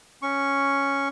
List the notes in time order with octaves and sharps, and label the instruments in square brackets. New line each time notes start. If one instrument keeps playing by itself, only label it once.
[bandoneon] C#4 C#6